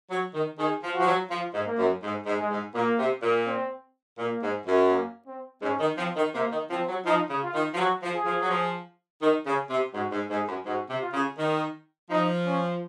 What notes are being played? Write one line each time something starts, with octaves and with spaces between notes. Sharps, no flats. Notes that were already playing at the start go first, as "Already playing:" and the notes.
F#3
D#3
D#3 G#4
F3
F#4
F3
F#3
F3 F4
G#2
A#3
F#2
G#2
G#2
G#3
G#2
A#2 A#3
C3
A#2
C4
A#2 A#3
G#2
F#2
A#3
C4
G#2 C#4
D#3
F3 C4
D#3
C3 A#3
D#3
F3 C4
F#3
F3 D#4
C#3
F4
D#3
F3
F#3 F#4
F3
G#4
F3
F#3
F3
D#3
C#3
C3
G#2 F#4
G#2
G#2 G#4
F#2
G#2 F#4
C3
F4
C#3
D#3
F3 D#4
C#4